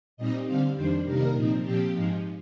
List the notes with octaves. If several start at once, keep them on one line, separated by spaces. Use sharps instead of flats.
A#2 G3 C4 D#4 D#5
D3 G3 C4 F5
F2 D#3 G3 D4 C5
C3 D#3 G3 A#3 D#4 A#4
A#2 F3 C4 D#4
A#2 F3 C4 G4
G#2 F3 G#3 D#4